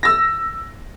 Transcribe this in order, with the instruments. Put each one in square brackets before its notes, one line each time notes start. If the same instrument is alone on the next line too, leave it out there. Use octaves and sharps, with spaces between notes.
[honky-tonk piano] E6 A#6